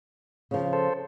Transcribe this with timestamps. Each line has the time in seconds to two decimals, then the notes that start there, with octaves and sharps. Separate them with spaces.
0.51 C#3 F3
0.73 A4 C5